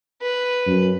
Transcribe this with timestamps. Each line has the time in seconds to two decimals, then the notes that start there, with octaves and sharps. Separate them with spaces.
0.22 B4
0.66 F#2